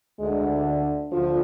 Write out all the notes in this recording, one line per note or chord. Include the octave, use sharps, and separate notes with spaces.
D2 D3 G#3
D2 D3 F3